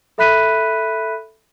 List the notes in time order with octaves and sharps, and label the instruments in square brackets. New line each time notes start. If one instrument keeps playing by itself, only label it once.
[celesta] A4 E5 B5 F#6 B6 D#7